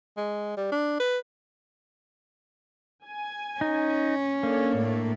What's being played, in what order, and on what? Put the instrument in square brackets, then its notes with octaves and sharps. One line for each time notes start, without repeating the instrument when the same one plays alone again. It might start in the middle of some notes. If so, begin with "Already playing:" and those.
[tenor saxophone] G#3
G3
D4
B4
[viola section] G#5
[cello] C#4 [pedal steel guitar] D#4
[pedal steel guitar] A#3 [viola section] D4 A4 C#5
[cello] A2 A3